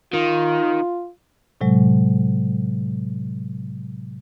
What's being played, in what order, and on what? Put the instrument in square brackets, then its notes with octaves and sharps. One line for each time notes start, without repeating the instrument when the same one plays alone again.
[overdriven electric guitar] D#3 [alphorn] F4
[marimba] A2 C3 F#3 G#3